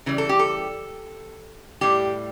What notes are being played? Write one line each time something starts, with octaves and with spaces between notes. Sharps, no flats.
C#3 E3 G3
A4
G4
A4
A2 G3 G4